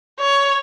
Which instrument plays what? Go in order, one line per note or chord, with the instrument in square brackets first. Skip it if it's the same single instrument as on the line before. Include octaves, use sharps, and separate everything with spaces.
[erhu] C#5